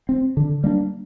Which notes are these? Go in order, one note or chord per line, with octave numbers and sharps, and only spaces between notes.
C4
D3
G3 A#3 D4